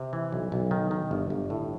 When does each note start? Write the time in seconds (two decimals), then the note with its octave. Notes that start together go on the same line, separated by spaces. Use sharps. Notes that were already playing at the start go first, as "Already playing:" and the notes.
Already playing: C3
0.13 E3
0.32 B1
0.52 B1
0.71 D#3
0.91 D#3
1.11 G1
1.30 G1
1.50 A2